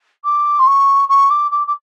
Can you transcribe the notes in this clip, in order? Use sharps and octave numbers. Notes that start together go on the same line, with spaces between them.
D6
C6
C#6
C#6
D6
D6
D6